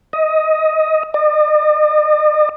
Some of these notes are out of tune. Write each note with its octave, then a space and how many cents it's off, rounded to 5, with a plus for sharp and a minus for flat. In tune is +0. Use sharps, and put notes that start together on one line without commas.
D#5 +15
D#5 -45